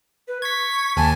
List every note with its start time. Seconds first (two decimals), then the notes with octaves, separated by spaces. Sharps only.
0.28 B4
0.42 C#6 G#6 B6
0.97 D#2 G#5 A5